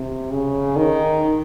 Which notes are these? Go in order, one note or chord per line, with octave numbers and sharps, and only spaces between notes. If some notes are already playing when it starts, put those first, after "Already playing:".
Already playing: C3
C#3
D#3